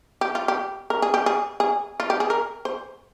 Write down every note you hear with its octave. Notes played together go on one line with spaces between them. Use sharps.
G4
F4
G4
A#4
G#4
G4
G#4
G#4
F4
G4
G#4
A#4
C5